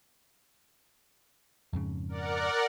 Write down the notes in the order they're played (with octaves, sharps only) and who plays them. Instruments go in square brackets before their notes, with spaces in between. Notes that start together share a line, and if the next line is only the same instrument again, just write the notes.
[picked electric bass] F2 G#2 C#3
[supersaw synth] A#4 D5 F#5